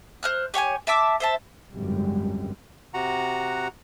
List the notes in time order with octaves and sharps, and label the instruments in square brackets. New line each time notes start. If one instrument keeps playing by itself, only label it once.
[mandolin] C5 F6 F#6
G4 C#5 G5 G#5
E5 A5 D6 E6
C5 E5 A5
[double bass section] G#1 C#2 F#2 D3 G3 G#3
[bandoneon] C3 F#4 F#5 A#5